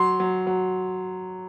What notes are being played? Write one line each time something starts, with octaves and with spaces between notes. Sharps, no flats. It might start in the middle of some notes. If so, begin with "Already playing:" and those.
Already playing: F#3 C6
F#3
F#3